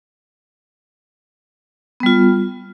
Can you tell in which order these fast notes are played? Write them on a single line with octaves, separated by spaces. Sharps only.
B3 G3 F4